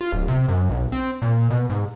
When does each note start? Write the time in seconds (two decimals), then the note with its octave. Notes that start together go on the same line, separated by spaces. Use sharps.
0.01 F4
0.12 D1
0.28 C3
0.48 F#2
0.69 B1
0.92 C4
1.22 A#2
1.50 B2
1.70 G#2